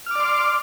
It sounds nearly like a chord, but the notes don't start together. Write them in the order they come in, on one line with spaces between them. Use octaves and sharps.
F6 D6 D5 C6